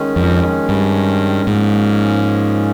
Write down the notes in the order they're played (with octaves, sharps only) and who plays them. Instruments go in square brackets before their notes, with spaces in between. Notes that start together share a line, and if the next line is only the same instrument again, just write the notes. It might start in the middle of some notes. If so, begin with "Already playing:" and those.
Already playing: [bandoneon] D#3 G#3 C#4
[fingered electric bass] F2
G2
[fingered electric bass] G#2 [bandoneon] F3 A#3 C#4